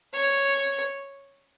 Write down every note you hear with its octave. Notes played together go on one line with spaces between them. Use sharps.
C#5